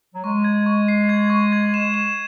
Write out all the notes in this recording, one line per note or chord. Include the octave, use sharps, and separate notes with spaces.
F#3
G#3 C#6
G#6
C#6
C7
G#6
C#6
G#6
E7
E7